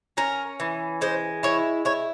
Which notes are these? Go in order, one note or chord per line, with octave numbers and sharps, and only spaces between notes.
C#4 A#4
E3
G#3 C5
E4 C#5
E4 C#5